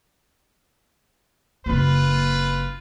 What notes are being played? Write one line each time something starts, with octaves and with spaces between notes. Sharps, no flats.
F#1 C4 F4 B4